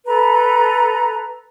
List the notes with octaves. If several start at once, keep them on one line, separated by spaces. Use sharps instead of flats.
A4 B4 A#5